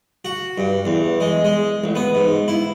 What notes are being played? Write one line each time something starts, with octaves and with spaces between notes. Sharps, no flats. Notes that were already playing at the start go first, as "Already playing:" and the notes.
F#4
G2
E2
G#3
G#3
A1
B3
G#2
E4